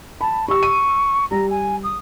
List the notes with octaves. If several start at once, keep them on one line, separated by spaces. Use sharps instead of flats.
A5 B5
G4 C#6 E6
D#7
G3 A#5
G#5
D#6